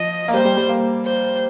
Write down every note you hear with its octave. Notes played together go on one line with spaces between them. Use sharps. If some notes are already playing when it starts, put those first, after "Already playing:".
Already playing: F3 D#5
A#3
G3 C5
G3
G3
A#3
C5